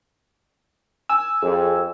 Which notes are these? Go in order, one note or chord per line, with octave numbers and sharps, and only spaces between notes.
G#5 E6
F2 G#4